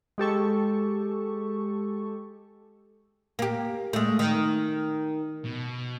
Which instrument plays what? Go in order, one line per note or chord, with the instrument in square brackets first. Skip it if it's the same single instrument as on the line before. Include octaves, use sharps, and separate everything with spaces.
[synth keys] G#3 G4 A4 C#6
[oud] A#3 G4
G#3 A3
D#3
[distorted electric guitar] B2